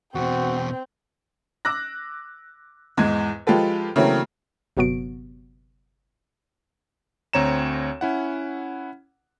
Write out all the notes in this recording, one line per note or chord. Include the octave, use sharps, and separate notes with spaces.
E2 B2 C4 F#4 G5
D6 E6 F#6 A#6
E2 G#2 G#3 G#6
F3 G#3 F4 G4 A4 B4
C#3 E3 F#3 A3 A#3 C4
G1 C3 F#3 B3 F#4 D7
D2 C4 C#5 A#5 E7
C#4 E4 F#5